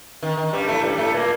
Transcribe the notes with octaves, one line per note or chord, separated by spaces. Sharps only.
D#3
D#3
G2 G3
A2 A3
G2 G3
A2 A3
A#2 A#3